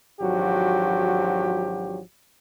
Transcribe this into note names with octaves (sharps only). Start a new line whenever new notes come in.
G#1 F3 F#3 D4 F#4 G4